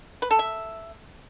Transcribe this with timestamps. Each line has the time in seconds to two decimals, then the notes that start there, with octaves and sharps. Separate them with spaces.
0.22 B4
0.31 A4
0.39 E5